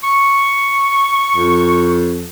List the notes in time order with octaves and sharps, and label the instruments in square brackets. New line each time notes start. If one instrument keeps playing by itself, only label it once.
[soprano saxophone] C#6
[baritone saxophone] F2